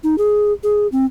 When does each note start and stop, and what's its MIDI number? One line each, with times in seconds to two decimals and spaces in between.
0.04 0.16 63
0.18 0.52 68
0.63 0.87 68
0.92 1.06 60